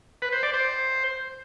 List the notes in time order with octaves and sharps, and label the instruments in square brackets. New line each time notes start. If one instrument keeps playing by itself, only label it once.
[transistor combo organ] B4
C5
D5
C5